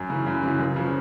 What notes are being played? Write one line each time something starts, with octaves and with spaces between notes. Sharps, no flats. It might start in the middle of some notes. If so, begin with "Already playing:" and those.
Already playing: F#2
C#3 E3
F#2
C#3 E3
C#2
C#3 F3